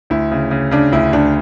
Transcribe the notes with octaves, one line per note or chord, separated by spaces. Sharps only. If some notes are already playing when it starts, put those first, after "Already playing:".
D2 E4
C#3
C#3
C#3 D4
D2 E4
D2 D4